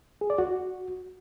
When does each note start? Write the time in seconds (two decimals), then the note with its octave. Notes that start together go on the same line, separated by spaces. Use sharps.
0.21 G#4
0.30 D5
0.38 F#4